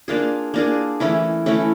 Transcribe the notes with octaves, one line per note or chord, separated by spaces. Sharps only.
A#3 D4 F4 G#4
A#3 D4 F4 G#4
E3 A3 C#4 E4
E3 A3 C#4 E4